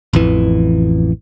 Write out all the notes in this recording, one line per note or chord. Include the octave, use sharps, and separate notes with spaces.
A1 F2 E3